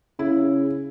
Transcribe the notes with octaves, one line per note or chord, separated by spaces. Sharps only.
C#3 E4